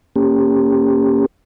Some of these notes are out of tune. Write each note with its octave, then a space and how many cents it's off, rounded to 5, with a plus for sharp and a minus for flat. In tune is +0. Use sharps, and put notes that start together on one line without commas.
A#3 +0 C#4 +0 G4 +20